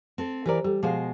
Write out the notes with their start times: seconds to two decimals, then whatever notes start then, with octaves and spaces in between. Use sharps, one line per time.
0.18 C4 A4
0.46 E3 G4 A#4 C5 D5 A#5
0.64 G3 G4 A4
0.83 B2 F3 G#3 G#4 C5 F5